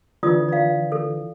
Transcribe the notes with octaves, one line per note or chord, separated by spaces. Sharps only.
D3 E3 F4 D5 D#6
D5 F5
A4